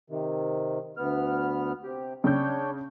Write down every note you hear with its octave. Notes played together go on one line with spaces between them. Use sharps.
C3 D#3
D2 B3 F6
C3 G4
C#3 D4 C#5 G5 G6